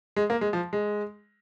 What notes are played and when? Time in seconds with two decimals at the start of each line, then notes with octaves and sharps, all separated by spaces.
0.16 G#3
0.30 A#3
0.41 G#3
0.53 F3
0.73 G#3